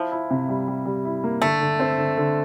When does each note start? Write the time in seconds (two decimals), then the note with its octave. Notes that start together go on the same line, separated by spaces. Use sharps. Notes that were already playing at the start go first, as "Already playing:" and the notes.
Already playing: F3 E4
0.12 E4
0.31 C3
0.49 G3
0.68 G3
0.85 G3
1.05 E4
1.24 A#3
1.42 D3 A3
1.61 D3
1.80 C4
1.98 D3
2.17 D3